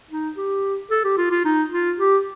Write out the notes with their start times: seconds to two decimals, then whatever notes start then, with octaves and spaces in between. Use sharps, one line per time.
0.11 D#4
0.37 G4
0.91 A4
1.05 G4
1.18 F4
1.31 F4
1.45 D#4
1.72 F4
1.99 G4